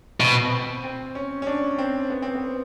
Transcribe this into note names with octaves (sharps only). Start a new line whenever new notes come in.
B2 C4
C4
C4
C#4
C#4
D4
C4
B3
C4
B3